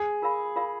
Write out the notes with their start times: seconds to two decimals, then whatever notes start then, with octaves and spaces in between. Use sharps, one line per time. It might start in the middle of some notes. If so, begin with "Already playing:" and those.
Already playing: G#4
0.22 F4 A#4 F5 B5
0.56 F4 A#4 F5 B5